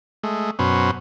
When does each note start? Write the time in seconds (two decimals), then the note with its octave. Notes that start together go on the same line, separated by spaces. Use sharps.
0.23 G#3 A3
0.59 F#2 B2 C#4 B4 C5